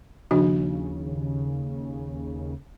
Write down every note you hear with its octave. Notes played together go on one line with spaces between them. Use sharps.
D#2 C#3 F3 D4 F#4